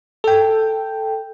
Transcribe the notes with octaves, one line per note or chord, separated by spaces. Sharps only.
A4 G5